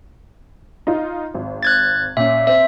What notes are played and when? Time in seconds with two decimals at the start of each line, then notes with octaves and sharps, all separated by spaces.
0.87 D#4 F4
1.34 G#1
1.63 F#6 G#6 A6
2.17 A#2 C#4 E5
2.47 C4 E5